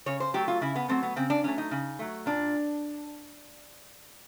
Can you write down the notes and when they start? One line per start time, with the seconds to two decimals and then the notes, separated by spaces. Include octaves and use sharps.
0.06 C#3 C#5
0.20 C5
0.34 F#3 A3 G4
0.48 F4
0.61 C#3 E4
0.75 B3
0.89 F#3 A3 C4
1.03 B3
1.16 C#3 C4
1.30 D4
1.44 F#3 A3 C#4
1.58 D#4
1.71 C#3
1.99 F#3 A3
2.26 A#2 D4